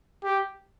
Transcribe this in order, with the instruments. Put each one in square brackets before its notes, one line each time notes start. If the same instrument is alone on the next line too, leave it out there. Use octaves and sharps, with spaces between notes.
[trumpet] G4